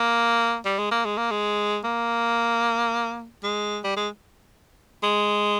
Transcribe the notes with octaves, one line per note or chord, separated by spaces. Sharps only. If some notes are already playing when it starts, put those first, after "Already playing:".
Already playing: A#3
G3
G#3
A#3
G#3
A#3
G#3
A#3
G#3
G3
G#3
G#3